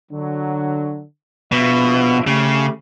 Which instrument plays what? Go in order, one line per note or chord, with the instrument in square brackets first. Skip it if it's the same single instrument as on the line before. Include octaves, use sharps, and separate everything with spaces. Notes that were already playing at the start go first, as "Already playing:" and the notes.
[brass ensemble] D3 F#3
[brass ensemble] A#1 F4 E5 [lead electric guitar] B2
[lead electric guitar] C#3 [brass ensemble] A3 G4